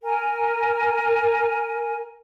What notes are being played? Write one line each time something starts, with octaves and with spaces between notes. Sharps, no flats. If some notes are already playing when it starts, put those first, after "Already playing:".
A#4 G#5